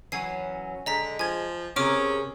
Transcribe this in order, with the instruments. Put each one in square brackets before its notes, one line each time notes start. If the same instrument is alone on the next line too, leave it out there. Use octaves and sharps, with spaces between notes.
[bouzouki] E3 F#3 C#4 [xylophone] G#5 C7
[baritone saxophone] D3 [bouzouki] G#3 [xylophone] D#5 A#5 B6
[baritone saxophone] F3 [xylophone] G#5 G#6
[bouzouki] C3 G#4 A#4 [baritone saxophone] C#4 [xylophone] D6 F6 D7